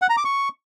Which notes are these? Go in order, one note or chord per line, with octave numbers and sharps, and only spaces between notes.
F#5
A#5
D6
C#6